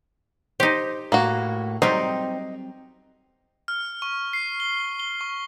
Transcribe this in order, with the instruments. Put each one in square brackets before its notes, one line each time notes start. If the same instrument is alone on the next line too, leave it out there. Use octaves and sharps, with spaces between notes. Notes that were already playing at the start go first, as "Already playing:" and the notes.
[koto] D#4 G4 [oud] C5
[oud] A2 [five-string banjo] A#3 F#4
[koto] F#3 G3 [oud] C4 [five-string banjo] D#4
[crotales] F6
C#6
C7
G7
G7
C#6